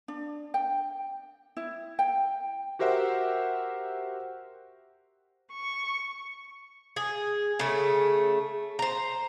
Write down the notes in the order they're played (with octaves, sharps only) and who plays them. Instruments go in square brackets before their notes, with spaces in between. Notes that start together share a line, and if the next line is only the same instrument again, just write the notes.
[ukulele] D4
G5
E4
G5
[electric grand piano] F#4 G4 A#4 C5 E5 F#5
[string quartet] C#6
[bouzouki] G#4
C#3 A3
C5 A#5